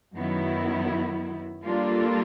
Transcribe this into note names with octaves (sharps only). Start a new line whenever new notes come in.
F#2 D#3 F#3 B3 E4
G3 A#3 D4 F4 A4